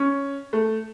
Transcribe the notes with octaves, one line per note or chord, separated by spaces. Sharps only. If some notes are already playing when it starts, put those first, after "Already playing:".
Already playing: C#4
A3